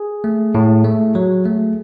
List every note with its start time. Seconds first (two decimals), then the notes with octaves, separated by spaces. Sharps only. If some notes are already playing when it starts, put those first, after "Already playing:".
Already playing: G#4
0.24 A3
0.55 A2
0.85 A3
1.15 F#3
1.46 A3